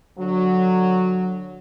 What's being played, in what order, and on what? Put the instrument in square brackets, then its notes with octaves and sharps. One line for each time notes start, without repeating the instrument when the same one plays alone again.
[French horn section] D3 F#3